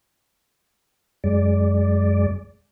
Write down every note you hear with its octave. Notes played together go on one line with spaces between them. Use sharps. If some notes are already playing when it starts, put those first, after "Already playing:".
F#2 G#3 D5